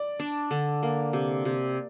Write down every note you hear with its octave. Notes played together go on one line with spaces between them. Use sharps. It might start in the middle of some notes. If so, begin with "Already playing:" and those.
Already playing: D5
D4
D3
A#3
C3
C3